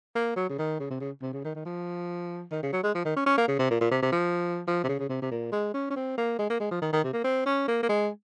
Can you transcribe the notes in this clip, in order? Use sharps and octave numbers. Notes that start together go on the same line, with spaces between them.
A#3
F#3
C#3
D#3
C#3
C3
C#3
C3
C#3
D#3
D#3
F3
D#3
C#3
F#3
G#3
F3
D#3
C#4
C#4
A#3
C#3
C3
A#2
A#2
C3
C3
F3
F3
C3
C#3
C#3
C3
C3
A#2
G#3
C#4
C#4
C4
A#3
G#3
A#3
G#3
F3
D#3
D#3
C3
A#3
C4
C#4
A#3
A#3
G#3